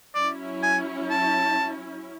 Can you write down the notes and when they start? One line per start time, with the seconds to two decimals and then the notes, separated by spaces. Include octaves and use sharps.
0.15 F#3 C#4 E4 D5
0.63 G#5
1.10 A5